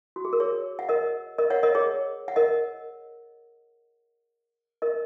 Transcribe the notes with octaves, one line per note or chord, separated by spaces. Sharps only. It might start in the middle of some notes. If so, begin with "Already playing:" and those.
F#4
G#4
A#4
G#4 C#5
F#5
A#4 D#5
A#4 D#5
C#5 F#5
A#4 D#5
G#4 C#5
F#5
A#4 D#5
A#4 D#5